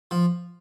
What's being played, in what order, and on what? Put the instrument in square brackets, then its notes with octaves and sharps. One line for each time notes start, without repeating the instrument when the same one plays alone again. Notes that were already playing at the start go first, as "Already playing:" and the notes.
[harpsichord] F3